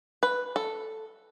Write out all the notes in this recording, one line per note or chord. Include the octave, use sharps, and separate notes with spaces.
B4
A4